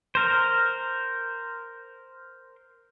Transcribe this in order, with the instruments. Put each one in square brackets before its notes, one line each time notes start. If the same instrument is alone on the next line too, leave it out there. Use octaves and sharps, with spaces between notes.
[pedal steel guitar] A#4 C5